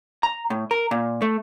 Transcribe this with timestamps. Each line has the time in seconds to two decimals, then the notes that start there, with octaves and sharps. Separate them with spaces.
0.23 A#5
0.50 A2
0.71 A#4
0.91 A#2
1.22 A3